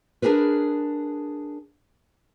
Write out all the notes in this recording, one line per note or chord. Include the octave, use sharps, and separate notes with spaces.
D4 D#4 G#4 A#4 B4